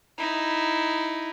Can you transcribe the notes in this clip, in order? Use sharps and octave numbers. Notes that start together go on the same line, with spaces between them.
D#4 E4